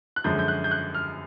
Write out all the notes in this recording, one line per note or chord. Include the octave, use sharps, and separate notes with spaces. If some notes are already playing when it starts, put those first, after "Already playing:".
F#6
F#2 D3 F3 G#3 G6
G6
F#6
G6
F#6
F6